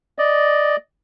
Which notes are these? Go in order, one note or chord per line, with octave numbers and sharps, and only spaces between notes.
D5 D#5